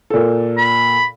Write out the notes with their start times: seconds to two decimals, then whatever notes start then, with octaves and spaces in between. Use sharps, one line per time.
0.10 A#2 A4
0.57 B5